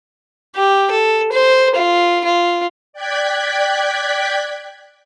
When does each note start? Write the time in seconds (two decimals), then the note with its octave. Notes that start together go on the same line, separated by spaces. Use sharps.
0.56 G4
0.91 A4
1.32 C5
1.75 F4
2.24 F4
2.93 D5 G5 F#6 G#6 B6